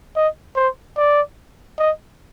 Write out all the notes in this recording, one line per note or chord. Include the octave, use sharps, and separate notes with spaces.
D#5
C5
D5
D#5